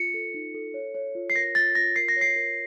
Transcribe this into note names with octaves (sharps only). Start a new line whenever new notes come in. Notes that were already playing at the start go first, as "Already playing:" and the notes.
Already playing: F4 C#7
A4
D#4
A4
C#5
C#5
F4
C7
A#4 A#6
F4 A6
F4 A#6
A#4 C7
A#6
C#5
C7
A#4